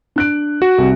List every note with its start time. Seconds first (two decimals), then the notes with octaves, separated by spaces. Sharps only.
0.16 D4 F#6 D7
0.62 F#4
0.78 C2